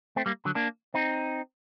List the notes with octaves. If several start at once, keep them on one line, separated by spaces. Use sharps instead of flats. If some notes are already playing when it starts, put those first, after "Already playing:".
A3 C4
G3 A#3
D3 F#3
A#3 D4
C4 D#4